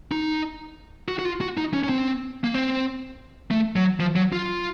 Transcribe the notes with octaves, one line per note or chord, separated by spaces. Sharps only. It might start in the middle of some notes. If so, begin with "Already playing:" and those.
D#4
F#4
F#4
F4
F#4
D#4
C#4
C#4
C4
A#3
C4
A3
F#3
F3
F#3
F4